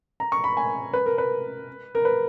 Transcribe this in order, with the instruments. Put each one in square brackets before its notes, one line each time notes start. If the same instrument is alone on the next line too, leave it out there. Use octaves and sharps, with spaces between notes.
[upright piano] A#5
C#6
B5
G#5
B4
A#4
B4
A#4
B4